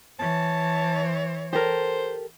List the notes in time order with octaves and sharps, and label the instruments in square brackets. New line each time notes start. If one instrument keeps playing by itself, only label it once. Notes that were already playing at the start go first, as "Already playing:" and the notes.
[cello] E3 C#5 [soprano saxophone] A5
[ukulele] G4 A4 A#4 [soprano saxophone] C5